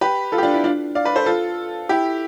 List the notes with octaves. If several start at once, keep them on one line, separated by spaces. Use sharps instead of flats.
G4 B4
F4 A4
G4
D4 F4
E4
D4 F4
D5 F5
B4 D5
A4 C5
F4 A4
E4 G4